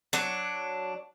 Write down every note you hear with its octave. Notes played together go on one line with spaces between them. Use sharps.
F#3 D4